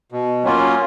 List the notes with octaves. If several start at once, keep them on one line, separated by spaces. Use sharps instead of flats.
B2
F#3 A#3 C#4 F4